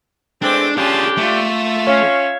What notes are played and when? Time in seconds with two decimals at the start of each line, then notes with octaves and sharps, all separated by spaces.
0.42 E2 G#3 A3 C4 D4 D6
0.77 D3 C#4 D4 F4 G4 G#4 A5
1.17 A3 F4 E5
1.87 C#4 C#5 F5